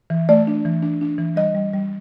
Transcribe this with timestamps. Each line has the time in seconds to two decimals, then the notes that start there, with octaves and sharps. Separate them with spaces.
0.10 E3
0.29 A3 D5
0.47 D4
0.65 E3
0.82 D4
1.01 D4
1.18 E3
1.36 G3 D#5
1.55 G3
1.73 G3